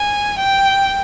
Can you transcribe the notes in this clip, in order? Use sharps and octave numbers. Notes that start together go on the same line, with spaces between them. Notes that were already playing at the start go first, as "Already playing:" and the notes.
Already playing: G#5
G5